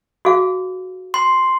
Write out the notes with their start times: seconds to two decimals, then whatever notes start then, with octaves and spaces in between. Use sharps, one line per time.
0.25 F#4 G#4 F5
1.14 C6